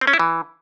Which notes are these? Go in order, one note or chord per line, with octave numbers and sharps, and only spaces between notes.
C4
C#4
E4
E3